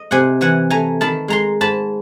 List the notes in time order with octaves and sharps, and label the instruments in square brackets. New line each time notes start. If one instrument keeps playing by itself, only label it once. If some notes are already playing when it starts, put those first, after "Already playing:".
Already playing: [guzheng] D#5
C3 F#5 G#5
E3 F#5 G#5
A3 G#5 A#5
D#3 A5 B5
G#3 A#5 C6
G#2 A5 B5